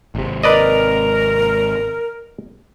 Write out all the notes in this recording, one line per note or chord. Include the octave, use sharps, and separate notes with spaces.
G#1 C3
A#4 B4 D5 D#5